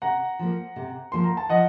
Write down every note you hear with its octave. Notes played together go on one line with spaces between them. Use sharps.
C3 F#5 A#5
F3 A#3
C3
F3 A#3 C6
A#5
A5
F3 D#5 F#5